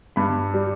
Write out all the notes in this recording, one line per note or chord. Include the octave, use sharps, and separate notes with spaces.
G2 B5
G3